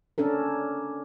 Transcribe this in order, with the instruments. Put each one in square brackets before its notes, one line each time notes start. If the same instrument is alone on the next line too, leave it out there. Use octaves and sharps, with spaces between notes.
[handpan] C#4 D4 A4 A#4